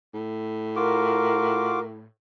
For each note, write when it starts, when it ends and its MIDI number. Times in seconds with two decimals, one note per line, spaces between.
0.14 2.05 45
0.76 1.80 65
0.76 1.80 66
0.76 1.84 70
0.76 1.80 86